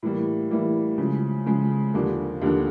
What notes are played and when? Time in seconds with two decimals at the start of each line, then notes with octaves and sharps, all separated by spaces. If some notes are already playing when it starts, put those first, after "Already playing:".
0.03 A2 E3 G3 A#3
0.51 A2 E3 G3 A#3
0.98 C#3 F3 G#3
1.46 C#3 F3 G#3
1.94 D#2 D3 F3 A#3 D4
2.42 D#2 D3 F3 A#3 D4